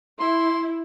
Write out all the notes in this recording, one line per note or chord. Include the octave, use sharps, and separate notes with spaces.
E4 C6